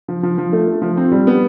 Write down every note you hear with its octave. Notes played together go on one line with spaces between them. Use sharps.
F3
F3
F3
A3
A3
F3
C4
G3
B3